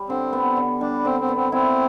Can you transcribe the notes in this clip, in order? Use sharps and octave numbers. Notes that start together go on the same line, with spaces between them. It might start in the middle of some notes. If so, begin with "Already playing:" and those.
Already playing: G3
D3 C4
B3
D3
G3 D4
D3 C4
C4
B3
C4
C4 E4